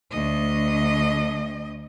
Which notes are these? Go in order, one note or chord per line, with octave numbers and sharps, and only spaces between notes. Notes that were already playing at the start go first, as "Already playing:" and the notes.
D2 D#5